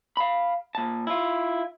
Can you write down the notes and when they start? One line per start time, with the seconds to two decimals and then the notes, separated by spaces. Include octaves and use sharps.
0.17 F5 B5
0.75 A#2 A5
1.07 E4 F4